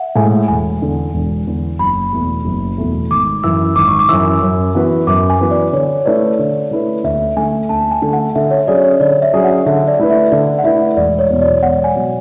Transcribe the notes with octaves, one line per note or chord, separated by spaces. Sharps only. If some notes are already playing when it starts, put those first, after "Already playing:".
Already playing: E5 F#5
A2 G#3 G#5
E1 G#5
E2 D3
E1
E2 D3
F#1 B5
E2 B2 A3
F#1
E2 B2 A3
G#1 D6
F#2 E3 E6
G#1 D6
C#6
D6
F#2 E3 E6
F#2
E3 B3 F#4 B4
F#2 D6
G#5
E3 B3 F#4 B4
D5
D3 C#5
A3 E4 B4 D5
D3
A3 E4 B4
D2 E5
D3 A3 G#5
D2 A5
G#5
D3 A3
F#5
D3 E5
C#5
F#3 C#4 G#4 D5
C#5
D3 D5
E5
F#3 C#4 G#4
F#5
D3 E5
D5
A3 E4 B4
E5
D3 D5
F#5
A3 E4 B4 E5
E1 D5
C#5
E2 B2 F#3
D5
E1 F#5
G#5
B2 F#3